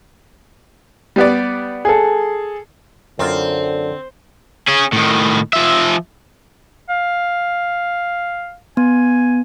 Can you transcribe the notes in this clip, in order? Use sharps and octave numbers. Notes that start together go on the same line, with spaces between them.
G3 B3 D5
G#4 A4
F#2 D3 C4 F4
C#4 G#4
A2 D#3
F3 E5
F5
B3 G#5